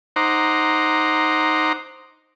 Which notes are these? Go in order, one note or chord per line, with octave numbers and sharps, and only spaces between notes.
D#4 C5 F#5 A#5 D6